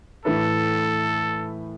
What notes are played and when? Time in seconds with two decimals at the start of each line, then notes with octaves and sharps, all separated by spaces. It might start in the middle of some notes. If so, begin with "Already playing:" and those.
0.25 A2 E3 A3 E4 A4 B4